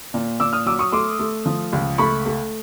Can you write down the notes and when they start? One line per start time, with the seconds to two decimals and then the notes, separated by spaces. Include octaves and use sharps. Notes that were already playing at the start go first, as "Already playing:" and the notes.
0.14 A#2
0.40 A#2 D6 E6
0.53 D#6 F6
0.66 F#3 D6 E6
0.79 C#6 D#6
0.92 A3 C6 D6
1.19 A3
1.46 F3
1.73 C#2
1.98 A3 B5 C#6
2.26 A3